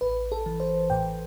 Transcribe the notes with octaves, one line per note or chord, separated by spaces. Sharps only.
A1 B4
A4
E3
C5
A2 G5